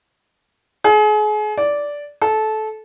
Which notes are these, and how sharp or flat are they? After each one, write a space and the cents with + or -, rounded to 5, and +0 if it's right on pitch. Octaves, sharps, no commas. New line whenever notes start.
G#4 +35
D5 -10
A4 -20